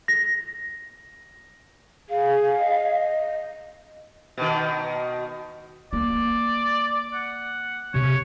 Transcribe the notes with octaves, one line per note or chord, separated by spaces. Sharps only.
A#6
G#4 F5
D#5
B2 D#3
A#3 D5
F#5
C3 C#5